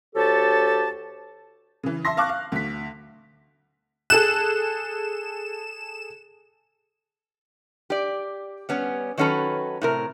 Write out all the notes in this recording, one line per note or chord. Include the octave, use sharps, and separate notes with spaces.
D2 G4 A4 C#5 A5
C#3 E3
E5 A5 C6 A#6
F5 A5 C#6 D6 F#6
F5
D2 B6
G#4 A4 F#6 E7
G4 D5
G3 B3 C#4
D#3 F#3 C#4 A4 B4
A2 C3 A#4